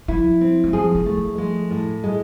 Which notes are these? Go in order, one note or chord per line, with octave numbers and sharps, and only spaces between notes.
F3 E4
C4
G#3
F3 G#4
F3
A3
F3
G#3
A2
G#3